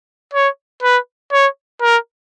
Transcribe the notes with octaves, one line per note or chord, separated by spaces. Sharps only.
C#5
B4
C#5
A#4